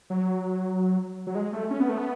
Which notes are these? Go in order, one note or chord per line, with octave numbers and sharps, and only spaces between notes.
F#3
F#3
G#3
A3
C#4
B3
A3
B3